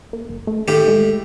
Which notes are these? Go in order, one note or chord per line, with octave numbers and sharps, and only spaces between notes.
A#3
G1
A3
A2 D#3 G4
G#3